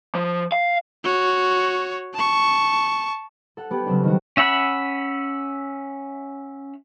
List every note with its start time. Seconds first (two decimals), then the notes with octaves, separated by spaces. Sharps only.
0.15 F3
0.52 F5
1.04 F#4 C#5
2.14 A5 C#6
3.57 A4 F#5
3.71 B3 G4
3.86 C#3 F#3 C4 D4
4.04 D#3 G3 F#4
4.37 C#4 E5 F#5 B5